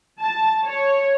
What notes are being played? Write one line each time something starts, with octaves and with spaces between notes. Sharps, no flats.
A5
C#5